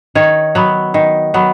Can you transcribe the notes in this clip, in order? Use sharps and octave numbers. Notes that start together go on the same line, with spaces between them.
D#3 C#5
F#3 B3
D#3
F#3 B3